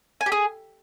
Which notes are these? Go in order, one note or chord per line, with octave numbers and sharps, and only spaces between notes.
G#5
G4
G#4